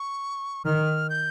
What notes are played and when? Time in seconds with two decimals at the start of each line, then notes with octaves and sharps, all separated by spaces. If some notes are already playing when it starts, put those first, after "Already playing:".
Already playing: C#6
0.65 D#3 F6
1.10 G6